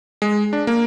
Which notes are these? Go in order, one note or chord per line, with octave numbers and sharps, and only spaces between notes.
G#3
D4
A#3